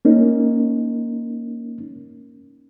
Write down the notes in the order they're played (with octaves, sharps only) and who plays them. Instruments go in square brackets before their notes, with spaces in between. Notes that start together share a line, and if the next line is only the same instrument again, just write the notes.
[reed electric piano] A#3 C#4 D#4 A#4